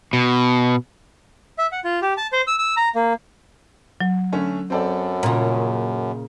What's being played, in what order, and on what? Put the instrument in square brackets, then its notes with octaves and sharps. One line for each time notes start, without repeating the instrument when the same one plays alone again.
[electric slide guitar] B2
[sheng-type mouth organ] E5
F#5
F4
G4
A5
C5
E6
E6
A#5
A#3
[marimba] F#3
[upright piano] D3 A3 C#4
[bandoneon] F#2 [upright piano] C4 A4 D5
[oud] A#2 C#3